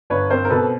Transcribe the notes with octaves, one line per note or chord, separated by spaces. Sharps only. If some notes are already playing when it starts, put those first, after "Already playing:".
G1 B4 C#5
C4 A#4 C5
A#4
B2 A4 B4